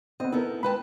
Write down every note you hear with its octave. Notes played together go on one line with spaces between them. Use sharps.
B3 C4 D#5
B3 D#4 E4 A4 A#4
G#3 B4 G5 A5 B5